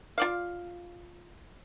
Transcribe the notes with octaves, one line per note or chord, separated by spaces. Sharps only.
F4 D5 F5